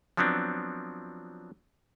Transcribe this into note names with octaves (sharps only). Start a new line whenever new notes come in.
F3 F#3 B3 C4 D4